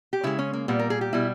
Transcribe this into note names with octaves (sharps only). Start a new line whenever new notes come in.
G4
C#3 G#3 E4
C#4
A#3
A#2 G3 B3
A#4
G#4
G4
B2 G3 E4